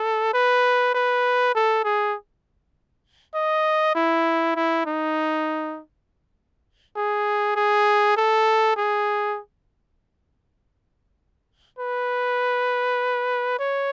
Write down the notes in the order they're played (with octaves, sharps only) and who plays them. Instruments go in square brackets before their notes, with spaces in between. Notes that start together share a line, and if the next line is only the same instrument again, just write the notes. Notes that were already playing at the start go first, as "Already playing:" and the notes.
Already playing: [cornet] A4
B4
B4
A4
G#4
D#5
E4
E4
D#4
G#4
G#4
A4
G#4
B4
C#5